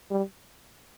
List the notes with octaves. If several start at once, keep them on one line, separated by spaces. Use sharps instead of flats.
G3